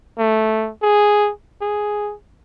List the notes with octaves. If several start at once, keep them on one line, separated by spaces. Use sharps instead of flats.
A3
G#4
G#4